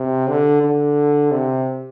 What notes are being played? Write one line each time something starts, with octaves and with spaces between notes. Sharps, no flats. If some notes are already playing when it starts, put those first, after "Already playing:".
Already playing: C3
D3
D3
C3